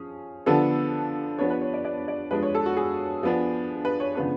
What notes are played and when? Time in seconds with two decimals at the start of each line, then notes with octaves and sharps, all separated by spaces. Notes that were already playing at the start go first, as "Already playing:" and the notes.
Already playing: F3 C#4 G#4
0.46 D3 F3 B3 D4 A4
1.39 F3 B3 D4 C#5
1.50 B4
1.62 C#5
1.74 D5
1.85 D5
2.08 D5
2.31 F3 G#3 D4 B4
2.43 C#5
2.55 A4
2.66 F#4
2.77 G#4
3.23 F3 B3 D4
3.85 B4
4.00 C#5
4.15 C#3 F3 B3 D4